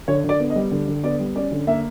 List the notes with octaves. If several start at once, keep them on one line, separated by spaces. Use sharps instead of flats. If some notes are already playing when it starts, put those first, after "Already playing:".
D3 C#5
D3
D5
B3
D#5
G3
D3
D3
B3 D5
G3
C#4 D5
D3
A#3 E5